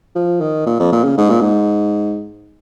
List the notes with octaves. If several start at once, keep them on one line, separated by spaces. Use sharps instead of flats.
F3
D#3
A#2
F2
A#2
C#3
G#2
A#2
G#2